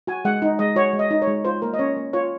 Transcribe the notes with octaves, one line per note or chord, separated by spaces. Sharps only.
F#4 G#5
G#3 F#5
D#4
G#3 D#5
F#4 C#5
G#3
D#5
D#4
C#5
G#3
F4 C5
A#3 A#4
D#5
C#4 C#5
A#3
F4 C#5